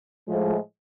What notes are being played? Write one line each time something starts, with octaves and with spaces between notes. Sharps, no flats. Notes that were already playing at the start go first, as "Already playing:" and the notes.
A2 F3 G#3